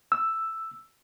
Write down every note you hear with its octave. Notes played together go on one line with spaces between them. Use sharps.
E6